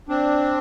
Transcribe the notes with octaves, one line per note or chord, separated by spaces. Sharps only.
C4 D4